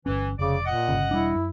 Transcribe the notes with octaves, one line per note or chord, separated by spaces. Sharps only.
G1 E3 C#4
F1 C#3 D5 D6
A#2 D#5 F#5
G1 C#3
E1 G3 D4 E4
F#2